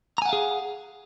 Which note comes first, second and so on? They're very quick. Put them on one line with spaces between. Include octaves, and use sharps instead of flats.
A#5 G#5 F#5 F5 G#4